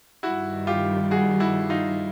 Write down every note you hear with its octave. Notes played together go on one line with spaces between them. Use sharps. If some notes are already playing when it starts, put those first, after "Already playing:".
G2 D#3 G3 E4 F#4
F4 G4
F#4 G#4
E4 F#4
D#4 F4